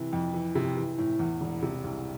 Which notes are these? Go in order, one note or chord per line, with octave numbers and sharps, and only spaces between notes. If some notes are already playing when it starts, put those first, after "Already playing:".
Already playing: C3 E3
F2
E3
C3
E3
A2
E2
E1
C3
C2